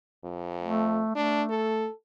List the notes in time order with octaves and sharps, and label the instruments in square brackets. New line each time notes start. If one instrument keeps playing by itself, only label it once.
[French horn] F2
[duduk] A3
[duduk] A3 [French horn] D4
[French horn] A4